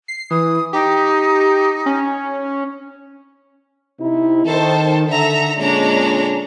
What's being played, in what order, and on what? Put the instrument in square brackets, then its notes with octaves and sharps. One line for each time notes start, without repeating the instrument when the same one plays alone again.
[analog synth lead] C7
[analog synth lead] E3 [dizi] D#6
[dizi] D#4 [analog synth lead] G4
[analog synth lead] C#4
[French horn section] C3 D#4 E4
[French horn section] D#3 [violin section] A4 C5 A5
[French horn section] D3 [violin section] A4 E5 A#5
[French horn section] A#2 D3 G#3 [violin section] C#4 D4 A#5